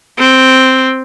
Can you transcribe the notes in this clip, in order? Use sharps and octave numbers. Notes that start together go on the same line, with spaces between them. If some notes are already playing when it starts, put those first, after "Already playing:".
C4